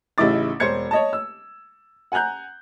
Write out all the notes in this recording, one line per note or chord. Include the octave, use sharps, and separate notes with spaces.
A1 C#3 D#4 E4 D6 A6
E1 C5 C#5 G#6 C#7
C#5 D#5 A5
E6
F#5 G#5 A#5 F#6 G6